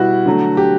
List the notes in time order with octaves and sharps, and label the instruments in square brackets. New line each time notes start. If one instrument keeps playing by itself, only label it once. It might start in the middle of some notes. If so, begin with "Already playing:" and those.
Already playing: [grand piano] B2 G3 B3 E4 F#4
D3 F#3 A3
G4